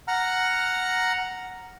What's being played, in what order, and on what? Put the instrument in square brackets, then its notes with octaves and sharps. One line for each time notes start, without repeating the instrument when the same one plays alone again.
[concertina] F#5 A#5 F6